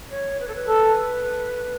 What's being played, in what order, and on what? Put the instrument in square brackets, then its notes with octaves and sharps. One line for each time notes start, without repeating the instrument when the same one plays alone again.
[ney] C#5
B4
A4
B4
[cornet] A4